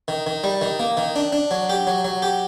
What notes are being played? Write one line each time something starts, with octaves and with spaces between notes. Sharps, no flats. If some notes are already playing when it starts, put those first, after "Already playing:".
D#3
D#3
G3
D#3
A#3
D#3
D4
D4
F#3
G4
F#3
F#3
G4